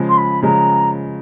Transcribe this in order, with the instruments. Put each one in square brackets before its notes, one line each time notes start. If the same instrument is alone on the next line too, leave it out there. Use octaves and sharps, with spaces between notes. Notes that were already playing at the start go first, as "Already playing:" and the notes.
Already playing: [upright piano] C#3 F3 G#3
[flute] C6
B5
[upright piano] C#3 F3 G#3 [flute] A#5